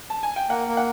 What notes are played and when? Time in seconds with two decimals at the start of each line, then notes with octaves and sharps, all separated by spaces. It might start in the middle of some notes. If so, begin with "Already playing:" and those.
0.10 A5
0.23 G#5
0.36 G5
0.49 A#3 F#5
0.67 A#3
0.77 F#5